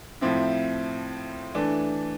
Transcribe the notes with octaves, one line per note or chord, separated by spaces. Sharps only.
A2 F3 C4 E4
E3 A3 D4